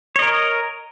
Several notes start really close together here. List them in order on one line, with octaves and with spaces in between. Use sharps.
C#5 D#5 A#4